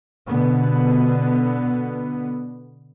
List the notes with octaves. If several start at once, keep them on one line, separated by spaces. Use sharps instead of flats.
B2 D3 B3